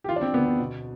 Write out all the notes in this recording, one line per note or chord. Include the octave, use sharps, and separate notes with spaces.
G4
E3 F4
D4
C4
D2 B3
C4
B2